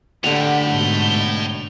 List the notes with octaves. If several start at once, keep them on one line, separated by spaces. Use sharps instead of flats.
A2 D3 G4 F#5 G5 F7
G#2 B2 G6